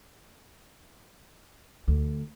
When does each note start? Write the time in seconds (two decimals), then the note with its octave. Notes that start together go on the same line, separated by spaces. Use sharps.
1.88 D2